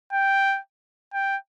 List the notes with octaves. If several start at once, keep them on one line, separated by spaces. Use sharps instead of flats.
G5
G5